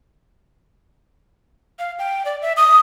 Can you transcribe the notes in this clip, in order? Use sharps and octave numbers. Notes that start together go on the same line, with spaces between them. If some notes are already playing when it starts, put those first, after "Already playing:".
F5
G5
D5
E5
D#6